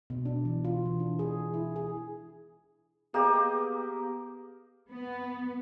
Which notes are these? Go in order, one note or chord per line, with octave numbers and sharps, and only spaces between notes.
B2
D4
E3
F4
E3
D4
G#4
E4
G#4
A#3 B3 G4 G#4 D#5
B3